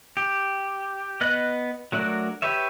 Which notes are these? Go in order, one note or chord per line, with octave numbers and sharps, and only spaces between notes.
G4
B3 B4 D#5 F#6
F#3 A3 D4 F#4 A#4
G4 B4 C#5 E5